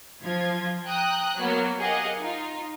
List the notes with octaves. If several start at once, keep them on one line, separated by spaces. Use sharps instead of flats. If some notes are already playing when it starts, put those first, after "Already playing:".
F3 F4 G#6
G5 A#5 D#6 F#6
F#3 A#3 B3
G4 G#4 A#4 D#5 F5 F#5
D#4 F4